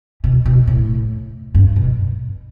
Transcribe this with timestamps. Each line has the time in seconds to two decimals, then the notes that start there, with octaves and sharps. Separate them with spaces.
0.24 B2
0.46 B2
0.67 A2
1.55 G2
1.76 B2